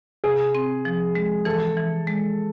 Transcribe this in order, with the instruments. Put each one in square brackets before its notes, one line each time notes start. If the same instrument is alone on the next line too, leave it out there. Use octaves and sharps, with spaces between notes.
[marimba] C3 [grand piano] G#4
[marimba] C4
F3
G#3
[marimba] E3 [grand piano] A4
[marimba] E3
G#3